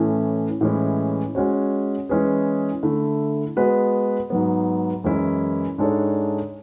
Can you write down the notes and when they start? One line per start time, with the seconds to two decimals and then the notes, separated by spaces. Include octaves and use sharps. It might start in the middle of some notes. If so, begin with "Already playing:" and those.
Already playing: A2 E3 A3 C#4
0.61 A2 E3 G#3 C#4
1.35 G#3 C#4 F#4 C#5
2.09 E3 G#3 C#4 G#4 B4
2.83 D3 A3 E4
3.56 G#3 B3 F#4 B4
4.30 G#2 F#3 B3
5.04 F#2 E3 G#3 C#4 E4
5.78 G#2 G#3 D4 A4 C#5